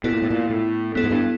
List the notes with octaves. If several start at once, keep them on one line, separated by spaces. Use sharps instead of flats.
B2 B3 E4 A4
A#2
A2
A#2
A2
A2 B3 E4 A4
G#2
G2